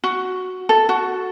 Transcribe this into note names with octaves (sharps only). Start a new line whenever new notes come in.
F#4
A4
F#4